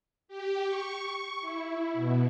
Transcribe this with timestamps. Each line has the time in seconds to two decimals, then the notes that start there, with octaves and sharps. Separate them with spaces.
0.28 G4
0.66 C#6
1.41 E4
1.93 B2